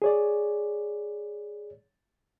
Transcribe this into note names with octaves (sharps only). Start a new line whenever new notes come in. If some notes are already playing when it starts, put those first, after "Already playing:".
G#4 C#5 D5